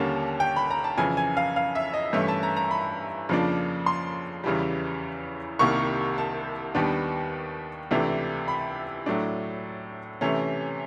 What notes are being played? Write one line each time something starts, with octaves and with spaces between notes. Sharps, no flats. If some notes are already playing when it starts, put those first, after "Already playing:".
Already playing: D#2 D3 G3 A#3 C#4 A5
G5
B5
A#5
A5
F2 C#3 E3 G#5
G#5
F5
F5
E5
D#5
G2 E3 A3 C#4 E5
A5
A#5
A#5
B5
F2 C#3 F3 A#3 D4
C6
E2 C#3 E3 G3
C2 C3 D#3 G3 A#3 C#6
A5
D#2 D#3 G3 B3 D4
C#2 C3 E3 A3 D4
B5
A2 F#3 A3 D4
C3 E3 A3 C#4